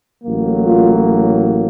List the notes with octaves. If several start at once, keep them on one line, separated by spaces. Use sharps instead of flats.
A1 A2 F#3 A#3
F4